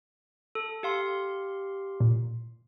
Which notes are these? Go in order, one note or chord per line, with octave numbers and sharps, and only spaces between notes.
A4
G4 F5 C6
A#2